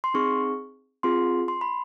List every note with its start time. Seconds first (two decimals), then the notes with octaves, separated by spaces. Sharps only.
0.04 C6
0.14 C4 D#4 G#4 C#6
1.03 C4 F4 G#4 C6
1.48 C6
1.61 B5